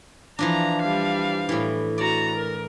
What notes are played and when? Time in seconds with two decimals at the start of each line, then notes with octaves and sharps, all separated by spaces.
0.39 E3 F3 D4 A#5
0.83 G3 F5
1.49 A2 E3
1.98 F#4 D5 A#5
2.36 A#4